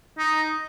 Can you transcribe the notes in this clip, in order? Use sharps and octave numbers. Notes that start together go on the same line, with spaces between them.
D#4